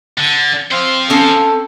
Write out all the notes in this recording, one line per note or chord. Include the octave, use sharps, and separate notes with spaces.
D3
C4 C5 F5
C4 C#4 A4